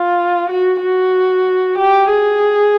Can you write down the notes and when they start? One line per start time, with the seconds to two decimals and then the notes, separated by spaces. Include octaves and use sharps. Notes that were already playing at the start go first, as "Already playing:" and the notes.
Already playing: F4
0.50 F#4
0.82 F#4
1.78 G4
2.10 G#4